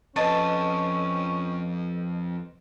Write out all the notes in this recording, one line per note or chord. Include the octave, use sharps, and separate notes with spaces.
F2 C#4 B4 D#5 A5 C#6